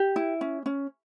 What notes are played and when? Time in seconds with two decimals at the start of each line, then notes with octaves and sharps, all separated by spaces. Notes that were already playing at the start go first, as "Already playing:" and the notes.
Already playing: G4
0.16 E4
0.41 C#4
0.66 C#4